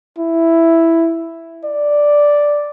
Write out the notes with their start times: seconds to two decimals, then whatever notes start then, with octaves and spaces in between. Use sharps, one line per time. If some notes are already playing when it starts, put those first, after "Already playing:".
0.18 E4
1.64 D5